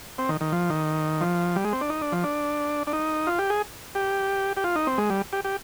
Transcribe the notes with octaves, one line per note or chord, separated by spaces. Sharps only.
C4
D#3
D#3
F3
D#3
F3
G3
G#3
C4
D4
D#4
D4
F3
D4
D4
D#4
F4
G4
G#4
G4
G4
F4
D#4
C4
G#3
G3
G4
G4